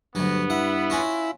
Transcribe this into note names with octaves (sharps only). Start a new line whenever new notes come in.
D2 G2 F#3 B3
E4 F#5
C#4 F4 F#4